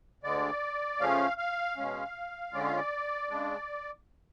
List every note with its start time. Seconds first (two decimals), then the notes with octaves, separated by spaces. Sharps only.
0.24 D2 D3 G#3 D5
1.00 C#3 F3 A3 C#4 F5
1.38 F5
1.77 B2 G#3 C#4
2.53 D3 G#3 C#4 F4 D5
2.65 F5
2.77 D5
3.30 C#3 G#3 D4